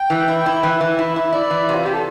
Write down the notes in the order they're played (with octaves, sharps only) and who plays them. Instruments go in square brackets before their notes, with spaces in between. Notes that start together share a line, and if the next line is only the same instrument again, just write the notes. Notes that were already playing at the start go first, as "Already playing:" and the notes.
Already playing: [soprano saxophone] G5
[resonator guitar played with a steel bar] E3
E4
E4
[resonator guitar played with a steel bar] E3 [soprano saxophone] E5
[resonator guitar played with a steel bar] E3
E4
E4
[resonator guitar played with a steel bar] E4 [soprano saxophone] D5
[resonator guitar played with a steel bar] E3
C3
[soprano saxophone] F4
[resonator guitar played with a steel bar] C3 [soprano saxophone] G4
[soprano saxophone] A4